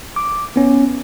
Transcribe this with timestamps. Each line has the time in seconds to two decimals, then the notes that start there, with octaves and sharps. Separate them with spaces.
0.16 D6
0.56 B3 C#4